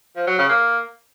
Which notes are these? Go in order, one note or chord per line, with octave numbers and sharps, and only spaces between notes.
F3
F#3
C#3
A#3